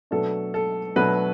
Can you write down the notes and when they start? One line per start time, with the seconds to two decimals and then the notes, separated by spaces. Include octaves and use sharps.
0.11 B2 F#3 A3 D4 A4
0.54 A4
0.96 B2 F#3 A3 D4 B4